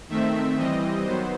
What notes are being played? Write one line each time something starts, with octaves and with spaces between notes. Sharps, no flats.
D#3 A3 C4 E5
E3 G3 C4 D#5
D#3 F#3 B3 C5